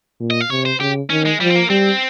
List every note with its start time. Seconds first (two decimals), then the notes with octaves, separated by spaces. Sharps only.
0.20 A#2
0.31 D#5
0.41 F5
0.50 C3 C#5
0.65 C5
0.80 C#3 G4
1.10 D#3 C#4
1.26 G#3
1.40 F3 G3
1.50 C4
1.55 A#3
1.70 G3 C4